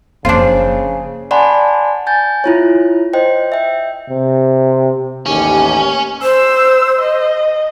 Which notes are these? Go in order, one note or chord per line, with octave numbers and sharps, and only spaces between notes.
F#1 C#3 F3 C4 D4 F4 C5 G5
D5 F#5 G#5 A5 B5 C6
G#5 G6 A6
E4 F4 C#5
C5 D#5 G5
E5 G5
C3
A1 D#2 C#4 G4
C5 E6
D#5